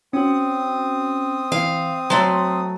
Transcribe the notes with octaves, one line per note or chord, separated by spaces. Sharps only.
C4 C#4 F#4 D#6
E3 F5
F#3 A3 C6